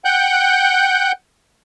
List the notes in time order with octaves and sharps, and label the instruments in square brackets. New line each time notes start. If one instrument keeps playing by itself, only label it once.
[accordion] F#5 G5 F#6 G6